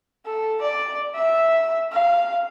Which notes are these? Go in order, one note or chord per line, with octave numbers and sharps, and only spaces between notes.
A4
D5
E5
F5